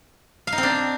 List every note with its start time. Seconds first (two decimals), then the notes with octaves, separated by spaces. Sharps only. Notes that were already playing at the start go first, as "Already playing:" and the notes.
0.47 F5
0.52 D#4
0.58 C4
0.63 D4